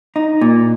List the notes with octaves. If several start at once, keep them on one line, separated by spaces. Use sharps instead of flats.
D#4
A#2